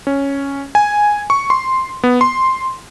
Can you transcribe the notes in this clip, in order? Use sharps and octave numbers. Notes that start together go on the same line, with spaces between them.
C#4
G#5
C#6
C6
B3
C6